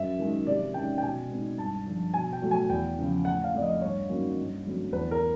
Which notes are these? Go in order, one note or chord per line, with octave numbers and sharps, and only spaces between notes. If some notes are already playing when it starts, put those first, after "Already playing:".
Already playing: F#2 E5
D#3 G#3
C3 D5
D#3 G#3 C#4 G5
G5
B2 G#5
G#3 C4 D#4
G2 A5
D3 F3
B2 G#5
G5
F#3 A3
G#5
E2 G5
C#3 F3
A2 F#5
F5
F3 A3 C4 D5
D#5
G2 C#5
D#3 F#3 A#3 C#4
G2
D3 F#3 A3 C4
E2 B4
A#4